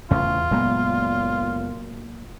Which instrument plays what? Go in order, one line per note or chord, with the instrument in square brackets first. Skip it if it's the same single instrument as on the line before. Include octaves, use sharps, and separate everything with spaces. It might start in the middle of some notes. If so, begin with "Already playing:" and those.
[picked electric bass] E1 A2 C#3 [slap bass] E2 [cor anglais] F4
[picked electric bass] F#1 G#3 B3 [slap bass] A#2 F#3 A#3